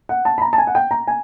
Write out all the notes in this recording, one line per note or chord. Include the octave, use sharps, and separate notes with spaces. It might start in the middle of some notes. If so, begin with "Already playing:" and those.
F#5
A5
B5
A#5
A5
G#5
F#5
G5
A#5
G#5